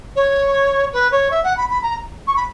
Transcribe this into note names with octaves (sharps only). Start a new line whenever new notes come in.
C#5
B4
C#5
E5
F#5
B5
B5
A#5
C#6
B5